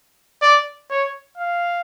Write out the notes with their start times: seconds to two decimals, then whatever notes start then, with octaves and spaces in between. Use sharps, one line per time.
0.42 D5
0.90 C#5
1.38 F5